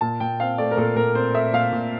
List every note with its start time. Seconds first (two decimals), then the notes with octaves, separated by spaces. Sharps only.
0.01 A#2 A5
0.20 A#2 G5
0.40 C4 F5
0.58 A3 D5
0.71 A#4
0.77 A#2 A4
0.96 A#2 A#4
1.15 C4 C5
1.34 A3 E5
1.53 A#2 F5
1.72 A#2